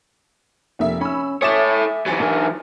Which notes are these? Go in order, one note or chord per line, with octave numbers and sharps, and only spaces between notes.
F1 A#3 E5
C#4 B5 E6
A4 C#5 E5 G#5 D6 D#6 A6 E7
E3 F#3 G#5 A6
D4 D#4 A#4